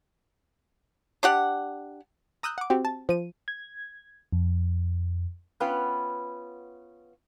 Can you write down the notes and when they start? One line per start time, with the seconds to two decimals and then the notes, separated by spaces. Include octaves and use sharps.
1.23 D4 G4 F#5
2.43 A#5 D#6 E6 F#6 G6
2.58 F#5 D6
2.70 C4 F#4 G4
2.85 A5
3.09 F3 D#7
3.48 G#6
4.32 F2
5.60 B3 C#4 F4 B4 G5